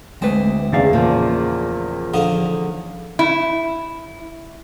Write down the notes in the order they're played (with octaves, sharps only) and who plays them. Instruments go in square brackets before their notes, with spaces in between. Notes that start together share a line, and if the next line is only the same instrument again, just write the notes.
[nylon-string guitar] D2 [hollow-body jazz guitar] G#3 B4 [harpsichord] C4
[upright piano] E2 C#3 [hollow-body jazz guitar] A3 D5 F5
[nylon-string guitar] A#2 F3
[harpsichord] D3 F3 D#4
[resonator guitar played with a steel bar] E4